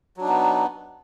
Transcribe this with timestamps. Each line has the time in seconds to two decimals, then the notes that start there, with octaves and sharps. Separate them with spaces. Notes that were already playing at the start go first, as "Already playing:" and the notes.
0.17 F#3
0.20 D4
0.24 D#4
0.28 B3